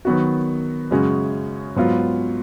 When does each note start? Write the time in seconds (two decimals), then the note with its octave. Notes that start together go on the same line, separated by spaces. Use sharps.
0.05 D#3 F#3 B3 F#4
0.91 F#2 C#3 G#3 C#4 F#4
1.76 G#2 F#3 B3 F4